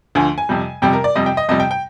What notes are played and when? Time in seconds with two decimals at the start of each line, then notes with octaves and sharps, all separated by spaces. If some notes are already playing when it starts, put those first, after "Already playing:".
0.15 D2 D3 F3 G#5
0.38 G#5
0.49 F2 C3 G3
0.82 F2 C3 G3 G5
0.93 A#4
1.04 D5
1.16 F2 C3 G3 D#5
1.26 G5
1.37 D#5
1.49 F2 C3 G3 D#5
1.60 G5
1.71 G5